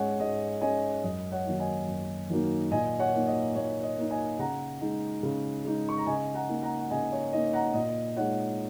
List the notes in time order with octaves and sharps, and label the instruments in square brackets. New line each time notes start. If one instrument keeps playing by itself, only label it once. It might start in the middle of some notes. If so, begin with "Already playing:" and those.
Already playing: [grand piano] G#2 G#3 C#4 C#5 D#5 F#5 G#5
G#2 D#5
G#3 C#4 D#5 G#5
F#2 D#5
C#5 F#5
D#3 F#3 A#3 D#4
D#5 G#5
F#2
D#3 F#3 A#3 D#4
A#2 D#5 G#5
C#5 F#5
A#3 D#4
D#5
A#2 C#5
D#5
A#3 D#4
D#5 G#5
C#3 F#5 A#5
G#3 D#4
C#3
G#3 D#4
C#6
A#5
C#3 D#5 G#5
F#5 A#5
A#3 D#4
F#5 A#5
F#5
C#3 D#5 G#5
C#5
A#3 D#4 D#5
F#5 A#5
A#2 D#5
G#3 D#4 C#5 F#5